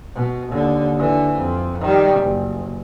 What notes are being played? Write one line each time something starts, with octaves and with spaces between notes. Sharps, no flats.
B2
D#2 D3
D3 E3
F2
D#3 G3
F#1